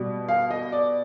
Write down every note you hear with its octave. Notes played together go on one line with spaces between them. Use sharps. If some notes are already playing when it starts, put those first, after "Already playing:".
Already playing: B2 G3
F5
D#5
D5